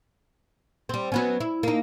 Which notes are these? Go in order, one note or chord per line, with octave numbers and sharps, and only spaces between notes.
G3 C4
F#3 B3 C#4
E4
A#3 D#4